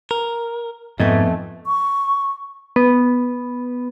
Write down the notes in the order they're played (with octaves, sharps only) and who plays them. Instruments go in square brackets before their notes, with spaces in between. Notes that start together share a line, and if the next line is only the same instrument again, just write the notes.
[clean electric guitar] A#4
[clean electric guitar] F2 [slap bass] G#2 [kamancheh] A3 [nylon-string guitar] B3 D#5
[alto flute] C#6
[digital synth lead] B3